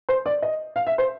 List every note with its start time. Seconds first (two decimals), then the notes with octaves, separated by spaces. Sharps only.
0.09 C5
0.26 D5
0.42 D#5
0.76 F5
0.87 E5
0.98 C5